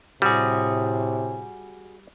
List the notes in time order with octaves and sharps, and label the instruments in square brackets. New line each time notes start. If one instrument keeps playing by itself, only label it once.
[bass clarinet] A2 [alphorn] C3 [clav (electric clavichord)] G3 [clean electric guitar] F#4 G#4